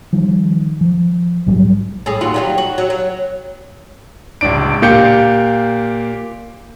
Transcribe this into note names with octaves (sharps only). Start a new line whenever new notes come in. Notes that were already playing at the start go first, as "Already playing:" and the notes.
D#3 F3 G3
F3
A#1 G#2 F#3 G3
A2 G#4
D#2 F4 F#4
F#3 G3 F4
F#4
F#3
F#3
D1 C#2 D4 D7
A#2 A#3 G4 G6 C#7